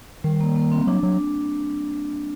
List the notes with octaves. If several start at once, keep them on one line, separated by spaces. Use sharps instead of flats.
D#3 G3
A#3
A#3
C4
F#3 D4
F#3